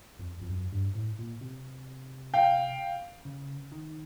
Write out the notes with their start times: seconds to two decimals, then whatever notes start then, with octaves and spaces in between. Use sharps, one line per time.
0.19 F2
0.42 F2
0.49 F#2
0.72 G2
0.95 A2
1.19 A#2
1.41 C3
2.34 F5 G5
3.25 C#3
3.72 D#3